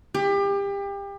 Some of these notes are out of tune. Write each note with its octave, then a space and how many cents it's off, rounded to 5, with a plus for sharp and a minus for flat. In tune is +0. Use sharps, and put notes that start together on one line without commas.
G4 +30